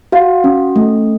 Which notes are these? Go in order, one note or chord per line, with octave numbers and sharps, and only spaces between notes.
F#4 F5
C#4
A3